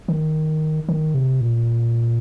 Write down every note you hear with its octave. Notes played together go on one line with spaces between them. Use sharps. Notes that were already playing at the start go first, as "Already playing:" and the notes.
D#3
D#3
C3
A#2